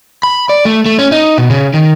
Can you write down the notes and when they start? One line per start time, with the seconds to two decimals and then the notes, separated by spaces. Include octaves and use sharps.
0.23 B5
0.49 D5
0.65 A3
0.86 A3
0.99 C#4
1.12 D#4
1.38 B2
1.50 C#3
1.74 D#3